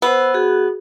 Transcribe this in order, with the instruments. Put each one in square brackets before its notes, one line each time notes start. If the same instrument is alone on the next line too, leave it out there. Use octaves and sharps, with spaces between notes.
[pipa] B3 [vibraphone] C5 E6
[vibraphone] F#4 G#4